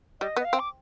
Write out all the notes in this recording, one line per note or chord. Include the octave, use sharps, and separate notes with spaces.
G3 D#5
B3
D#5
F5
C4
D6